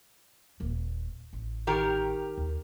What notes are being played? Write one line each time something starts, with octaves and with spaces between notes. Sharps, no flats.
D#1 A#3
A1
D#3 G4 A#4
D#2